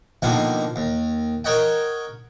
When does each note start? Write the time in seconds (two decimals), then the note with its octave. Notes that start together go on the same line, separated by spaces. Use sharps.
0.22 B2 D3 D#3 F3 A#3
0.76 D#2
1.44 A#4 C#5 D#5 F#5 G5